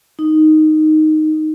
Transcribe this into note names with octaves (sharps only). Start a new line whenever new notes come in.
D#4